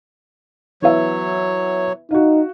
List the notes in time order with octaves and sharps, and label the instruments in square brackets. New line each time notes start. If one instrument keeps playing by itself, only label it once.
[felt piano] E3 B3 E5 [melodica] F#3 C#5
[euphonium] D#4 [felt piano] F#4 F5